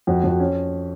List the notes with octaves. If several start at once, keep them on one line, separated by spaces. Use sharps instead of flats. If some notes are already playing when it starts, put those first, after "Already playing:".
F2 F#4
F2
F#4
C#4